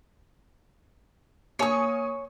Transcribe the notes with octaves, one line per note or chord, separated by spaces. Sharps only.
A#3 C#5 G#5 C#6 D#6